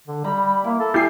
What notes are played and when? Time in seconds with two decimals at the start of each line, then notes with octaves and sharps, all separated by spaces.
0.07 D3
0.24 G3 A#5 B5
0.64 A#3 E4
0.80 A4
0.94 G3 E4 G4 G5 G#5 C7